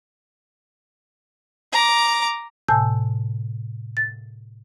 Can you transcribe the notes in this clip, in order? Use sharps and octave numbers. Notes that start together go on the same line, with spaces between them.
A#5 D6
A2 C3 G#5 A5 E6 G6
A6